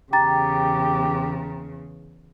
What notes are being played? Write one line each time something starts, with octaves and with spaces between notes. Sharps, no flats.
E2 C#3 G4 G5 A#5 A6